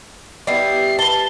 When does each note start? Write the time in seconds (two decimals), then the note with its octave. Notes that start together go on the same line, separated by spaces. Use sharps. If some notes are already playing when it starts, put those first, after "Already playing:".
0.47 G3 B3 E4 C7
0.99 B4 A5 G7